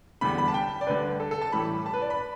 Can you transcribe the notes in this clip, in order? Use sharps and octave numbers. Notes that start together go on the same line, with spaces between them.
E2 D3 G3 B5
B5
A5
G5
D5
D2 D3 G3 B4
A4
A4
A5
A2 E3 G3 B5
A5
B4
D5
B5